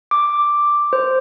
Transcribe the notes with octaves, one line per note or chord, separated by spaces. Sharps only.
D6
C5